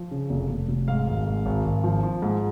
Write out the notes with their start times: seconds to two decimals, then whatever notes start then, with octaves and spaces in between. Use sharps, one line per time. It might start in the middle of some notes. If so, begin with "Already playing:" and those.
Already playing: F3
0.11 C#3
0.30 F1
0.50 F1
0.68 F1
0.88 G#2 F5
1.07 G#1
1.26 G#2
1.46 G#1
1.64 G#1
1.84 F3
2.03 F3
2.22 G#2